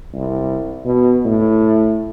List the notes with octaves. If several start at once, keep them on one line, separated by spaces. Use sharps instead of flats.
C2
B2
A2